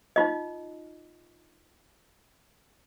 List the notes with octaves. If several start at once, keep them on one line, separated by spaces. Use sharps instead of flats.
D#4 F4 D#5